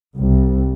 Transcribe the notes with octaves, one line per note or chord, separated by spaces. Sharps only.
C2